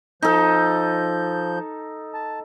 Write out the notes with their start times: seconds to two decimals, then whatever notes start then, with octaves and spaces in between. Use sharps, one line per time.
0.22 F3 D#4 A4 G6
2.14 A5